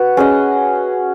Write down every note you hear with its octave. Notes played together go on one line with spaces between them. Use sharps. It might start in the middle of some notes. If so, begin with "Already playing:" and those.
Already playing: F#4 B4
C#4 G#4 D#5